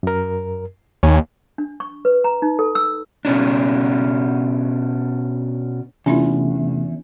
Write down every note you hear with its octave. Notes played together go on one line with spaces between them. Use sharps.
F#2 A#4
D#2 C#5 G#5
D4
C#6
B4
A#5
D#4
A4
E6
B2 C#4 D4
E2 C3 A3 C#4 D4 E4 F4